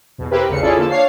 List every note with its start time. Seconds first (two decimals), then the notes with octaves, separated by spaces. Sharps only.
0.18 E2 B2
0.31 C4 E4 G4 A#4 B4
0.49 A1 E2 C#3 C#7
0.62 C#4 E4 F4 G#4 A4 D5
0.76 D3 F3 A#3 A4
0.90 D4 C#5 F5 C7